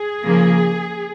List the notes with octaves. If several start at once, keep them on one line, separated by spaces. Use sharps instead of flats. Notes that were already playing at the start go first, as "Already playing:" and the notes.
Already playing: G#4
C#3 F3 A#3